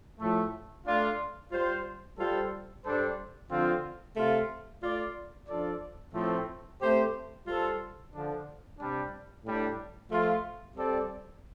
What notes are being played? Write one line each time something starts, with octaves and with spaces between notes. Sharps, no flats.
A2 F3 A3
A3 D4 F4
G3 F4 C5
G3 F4 A4 C5
G2 G3 D4 A4 C5
D3 F3 C4 F4
C3 A3 F4
A3 F4 D5
F3 D4 F4 A4 D5
A2 F3 A3 C4
A3 C4 G4 C5
G3 F4 A4 C5
D3 F3 D4
C3 G3 D4
A2 G3 D4
F3 A3 F4
G3 C4 A4 D5